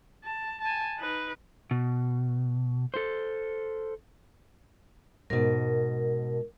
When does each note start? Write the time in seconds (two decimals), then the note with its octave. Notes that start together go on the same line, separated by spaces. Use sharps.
0.25 A5
0.61 G#5 A5
0.98 D#4 B4
1.71 B2
2.94 A4 C5
5.30 G#2 B2 A#4